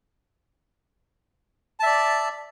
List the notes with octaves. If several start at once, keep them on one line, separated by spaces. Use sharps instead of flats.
D5 E5 A5